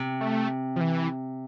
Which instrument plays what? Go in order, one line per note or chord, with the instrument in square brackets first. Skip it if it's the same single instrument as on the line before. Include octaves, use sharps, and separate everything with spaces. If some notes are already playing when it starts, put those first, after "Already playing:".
Already playing: [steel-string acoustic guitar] C3
[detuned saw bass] A3
F3
E3